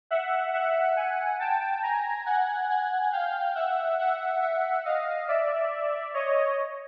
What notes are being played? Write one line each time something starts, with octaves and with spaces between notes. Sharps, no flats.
E5 F#5
E5 F#5
F#5 G#5
G5 A5
G#5 A#5
F#5 G#5
F#5 G#5
F5 G5
E5 F#5
E5 F#5
E5 F#5
D#5 F5
D5 E5
C#5 D#5